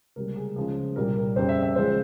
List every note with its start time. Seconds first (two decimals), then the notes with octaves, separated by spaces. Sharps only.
0.16 C#2 C3 G3 A#3 A#4
0.36 G#4
0.56 C#2 C#3 F3 G#3 G#4
0.96 C2 A#2 G3 A#3 A#4
1.17 A#4
1.36 F2 C#3 G3 C5
1.49 E5
1.63 E5
1.76 C#2 C#3 F3 G#3 C5